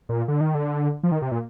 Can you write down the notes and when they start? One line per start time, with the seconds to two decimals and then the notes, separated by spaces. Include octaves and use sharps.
0.09 A#2
0.28 D3
0.41 D#3
0.55 D3
1.03 F3
1.12 D#3
1.22 C3
1.31 A#2